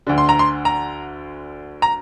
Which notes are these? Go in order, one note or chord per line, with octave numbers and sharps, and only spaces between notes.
D2 D3
C6
A#5
C6
A#5
A#5